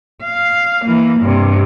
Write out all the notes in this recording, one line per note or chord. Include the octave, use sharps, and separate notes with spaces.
F5
E3 A#3
G2 C3